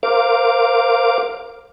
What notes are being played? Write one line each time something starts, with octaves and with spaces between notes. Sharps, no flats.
A#4 C5 F5 D6